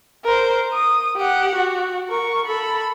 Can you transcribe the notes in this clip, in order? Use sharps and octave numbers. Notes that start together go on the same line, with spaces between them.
A#4 C5
D#6
G4 F#5
F#4
A#4 C#6
A4 B5